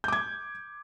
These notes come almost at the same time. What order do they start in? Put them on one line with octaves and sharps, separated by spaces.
G6 D6 G#6